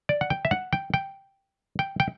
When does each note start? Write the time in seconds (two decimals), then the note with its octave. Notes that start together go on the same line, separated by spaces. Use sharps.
0.09 D5
0.21 F#5
0.30 G5
0.45 E5
0.51 F#5
0.73 G5
0.94 G5
1.79 G5
2.00 G5